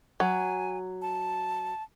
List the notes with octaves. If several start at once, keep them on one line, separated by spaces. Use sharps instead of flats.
F#3 G#5
A5